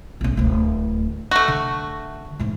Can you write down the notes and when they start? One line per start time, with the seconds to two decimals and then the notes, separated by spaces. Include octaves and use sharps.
0.21 B1 C#4
0.37 D1 D2
1.31 A3 F#4
1.48 D3
2.39 A1 G#2